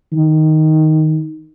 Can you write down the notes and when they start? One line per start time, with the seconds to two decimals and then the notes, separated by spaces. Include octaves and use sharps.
0.12 D#3